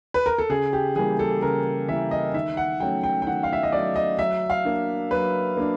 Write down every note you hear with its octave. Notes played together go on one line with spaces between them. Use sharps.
B4
A#4
A4
C#3 G#4
G4
E3 G3 A#3 G#4
A4
C#3 A#4
E3 G3 A#3 E5
D#5
D#3 E5
F#5
F#3 A3 C#4 G5
G5
G5
D#3 F#5
F5
E5
D#5
F#3 A3 C#4 D5
D#5
F#3 E5
F5
A#3 D4
F#3 B4
A#3 D4